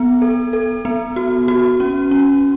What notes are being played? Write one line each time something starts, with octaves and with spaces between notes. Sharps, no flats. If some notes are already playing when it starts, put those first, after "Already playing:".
Already playing: B3
A4
A4
B3
F#4
F#4
C#4
C#4